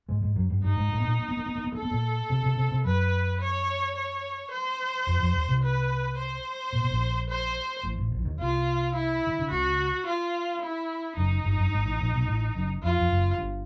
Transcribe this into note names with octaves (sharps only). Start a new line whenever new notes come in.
G#2 G#3
G#2 G#3
F#2 F#3
G2 G3
G2 G3 D#4
G#2 G#3
A2 A3
B3
A#2 A#3
A#3
B3
A#3
B3
A#3
B3
A#3 A4
B3
A#2 A#3
C3 C4
C3 C4
C3 C4
C3 C4
F#2 F#3 B4
C#5
C#5
C5
F2 F3
F2 F3
D#2 D#3
C2 C3
B4
C5
A#2
B2
A#1 A#2
C5
A1 A2
A1 A2
A#1 A#2
E3
D#2 D#3
C2 C3 F4
E4
D#3
D3
C#2 C#3 F#4
F4
E4
F#1 F#2 D#4
G1 G2
F#2
G2
G#1 G#2
A1 A2
A#1 A#2
B1 B2
A1 A2
F#1 F#2
F2 F4
F2
F#1 F#2
G1 G2